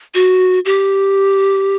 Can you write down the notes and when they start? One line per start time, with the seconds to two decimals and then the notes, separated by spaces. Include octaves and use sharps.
0.14 F#4
0.65 G4